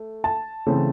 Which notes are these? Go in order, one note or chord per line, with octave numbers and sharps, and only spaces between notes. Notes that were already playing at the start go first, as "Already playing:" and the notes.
Already playing: A3
A5
C#3 E3 A3 C4